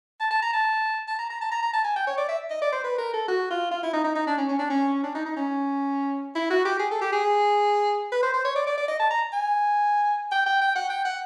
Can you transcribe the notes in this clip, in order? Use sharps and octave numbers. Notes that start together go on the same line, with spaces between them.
A5
A5
A#5
A5
A5
A#5
A#5
A5
A#5
A#5
A5
G#5
G5
C#5
D5
E5
D#5
D5
C5
B4
A#4
A4
F#4
F4
F4
E4
D#4
D#4
D#4
D4
C#4
C#4
D4
C#4
D4
D#4
D#4
C#4
E4
F#4
G4
G#4
A4
G4
G#4
B4
C5
C5
C#5
D5
D5
D5
D#5
A5
A#5
G#5
G5
G5
G5
F#5
G5
F#5